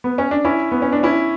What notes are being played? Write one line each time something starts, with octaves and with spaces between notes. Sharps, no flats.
B3
C#4
D4
C#4 E4
B3
C#4
D4
C#4 E4